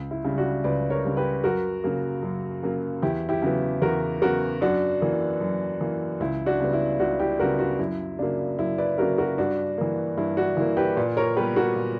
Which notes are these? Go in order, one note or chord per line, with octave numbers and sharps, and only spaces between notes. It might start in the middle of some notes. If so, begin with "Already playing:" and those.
Already playing: C#2
E4
C#3 G3
D4 F#4
C#2 B4 D5
A#4 C#5
C#3 G3
G4 B4
F#2 F#4 A#4
C#3 F#3 A#3
F#2
C#3 F#3 A#3
E2 E4 G4
E4 G4
C#3 F#3 B3
E2 F#4 A#4
C#3 F#3 B3 F#4 A#4
F#2 D4 F#4
E3 A#3
F#2
E3 A#3
C#2 E4
D4 F#4
C#3 G3 B3
E4
C#2 D4 F#4
E4 G4
C#3 G3 B3 F#4 A#4
D4 F#4
F#2 E4
C#3 F#3 A#3 D4
F#2 E4
B4 D5
C#3 F#3 A#3 F#4 A#4
F#4 A#4
G2 D4 F#4
E3 A#3
G2 E4
D4 F#4
E3 A#3 E4
G4 B4
A#2 B4 D5
A#4 C#5
G3 B3 G4 B4
F#4 A#4
A#2